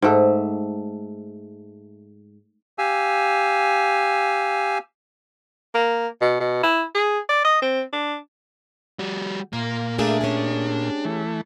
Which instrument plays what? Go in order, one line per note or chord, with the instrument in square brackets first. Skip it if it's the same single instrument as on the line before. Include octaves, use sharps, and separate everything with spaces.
[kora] G#2 A3
[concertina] G4 F5 G#5 E6
[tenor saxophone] A#3
B2
B2
E4
G#4
D5
D#5
C4
D4
[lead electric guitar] G3 F#4
[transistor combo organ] A#2 [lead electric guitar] A#3 [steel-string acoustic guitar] F4
[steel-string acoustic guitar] A3 A#3 G#4 [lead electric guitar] D4
[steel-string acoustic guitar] C#4 G4 G#4
[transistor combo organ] E3 A3